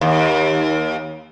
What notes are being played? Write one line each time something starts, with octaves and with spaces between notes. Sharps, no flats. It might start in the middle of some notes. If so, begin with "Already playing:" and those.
D#2